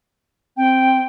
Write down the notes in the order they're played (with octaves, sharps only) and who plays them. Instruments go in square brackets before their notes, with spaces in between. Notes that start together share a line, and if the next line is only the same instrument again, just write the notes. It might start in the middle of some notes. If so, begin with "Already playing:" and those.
[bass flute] C4 [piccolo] G5